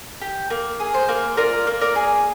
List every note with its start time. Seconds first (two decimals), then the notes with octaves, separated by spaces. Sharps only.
0.21 G4
0.50 A#3
0.80 G#4
0.94 C5
1.08 A#3
1.37 F4 A#4 D5
1.67 A#3
1.81 A#4 D5
1.96 G#4